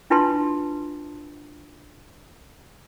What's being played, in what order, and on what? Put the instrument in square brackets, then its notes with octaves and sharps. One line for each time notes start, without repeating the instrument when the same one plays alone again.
[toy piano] D4 E4 F4 B4 A5 C6